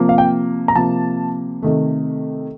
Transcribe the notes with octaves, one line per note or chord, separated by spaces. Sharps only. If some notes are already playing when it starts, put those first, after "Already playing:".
Already playing: C3 F3 A#3
F5
G5
A#5
C3 F3 A#3 A5
C3 D#3 A3